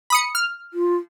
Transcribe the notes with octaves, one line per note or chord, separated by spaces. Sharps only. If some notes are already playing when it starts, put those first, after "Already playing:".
B5 D#6 C#7
F6
F4